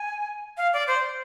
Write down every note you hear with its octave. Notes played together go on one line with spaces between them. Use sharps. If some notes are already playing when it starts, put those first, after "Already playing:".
Already playing: G#5
F5
D5
C5